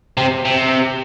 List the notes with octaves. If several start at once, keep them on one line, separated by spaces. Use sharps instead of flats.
C3
C3